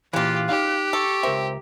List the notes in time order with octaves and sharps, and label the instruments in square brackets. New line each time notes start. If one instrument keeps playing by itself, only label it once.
[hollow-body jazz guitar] A#2 E3 [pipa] C#3 F4 [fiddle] G4 [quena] F#6
[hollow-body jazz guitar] D#4 F5 [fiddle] G4
[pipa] A4 [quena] C#6
[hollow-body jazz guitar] C#2 A#4 E5 [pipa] C4